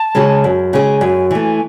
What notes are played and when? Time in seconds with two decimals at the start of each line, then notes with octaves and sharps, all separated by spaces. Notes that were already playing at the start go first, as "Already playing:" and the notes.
Already playing: A5
0.15 C#3 G#3 C#4 G#4
0.44 F#2
0.73 C#3 G#3 C#4 G#4 G#5
1.01 F#2 G#5
1.31 E3 A3 G#5